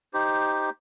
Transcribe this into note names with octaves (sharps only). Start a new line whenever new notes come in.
D#4 G4 C5